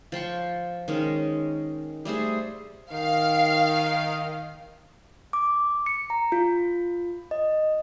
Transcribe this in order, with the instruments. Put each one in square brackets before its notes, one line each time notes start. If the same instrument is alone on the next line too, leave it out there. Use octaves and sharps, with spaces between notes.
[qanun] F3 G5 C6 C#6
D#3 G#3 C#4
G3 A3 G#4 C5
[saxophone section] D#3 [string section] F5
[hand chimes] D6
C#7
A#5
F4
D#5